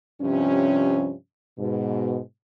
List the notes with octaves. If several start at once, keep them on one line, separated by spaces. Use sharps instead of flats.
G2 C3 F3 C#4
G#2 B2